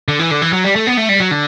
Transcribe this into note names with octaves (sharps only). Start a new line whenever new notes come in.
D3
E3
D3
E3
F#3
G3
A3
B3
A3
G3
F#3
D3